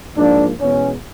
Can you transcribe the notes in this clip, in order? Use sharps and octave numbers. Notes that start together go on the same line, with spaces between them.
G#2 F3 A#3 D4
E2 B2 G#3 B3 C#4